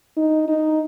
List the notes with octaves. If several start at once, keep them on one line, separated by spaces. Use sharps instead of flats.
D#4
D#4